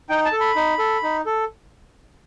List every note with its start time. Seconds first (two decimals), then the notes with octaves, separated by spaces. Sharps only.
0.09 D#4 G5
0.25 A5
0.32 A4
0.40 B5
0.56 D#4
0.79 A4
1.03 D#4
1.26 A4